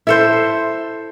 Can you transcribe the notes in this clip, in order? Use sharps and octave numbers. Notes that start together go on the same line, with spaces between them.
E4 A4 C5